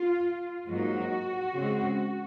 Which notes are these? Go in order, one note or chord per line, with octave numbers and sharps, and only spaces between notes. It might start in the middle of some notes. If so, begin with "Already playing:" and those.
Already playing: F4
G#2 F#3 A#3 D#4 F#4
C#3 G#3 C4